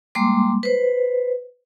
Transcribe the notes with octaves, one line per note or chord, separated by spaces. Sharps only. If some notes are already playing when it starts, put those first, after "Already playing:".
G3 G#3 A#3 C6 D6
B4 C5